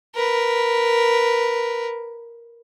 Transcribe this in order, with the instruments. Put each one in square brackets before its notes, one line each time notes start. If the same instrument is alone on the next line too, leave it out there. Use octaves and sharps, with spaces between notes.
[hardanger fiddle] A#4 B4